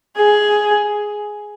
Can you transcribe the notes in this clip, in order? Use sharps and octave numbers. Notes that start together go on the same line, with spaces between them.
G#4